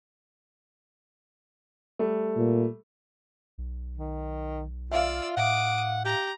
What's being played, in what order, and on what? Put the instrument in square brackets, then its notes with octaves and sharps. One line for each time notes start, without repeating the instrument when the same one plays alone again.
[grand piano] G3 A3
[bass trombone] A#2
[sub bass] B1
[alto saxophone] D#3
[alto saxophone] F4 [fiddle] D5 E6 [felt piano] E5 F5
[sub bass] A2 [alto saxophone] F#5 [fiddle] D6 D#6
[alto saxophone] G4 [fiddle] A#5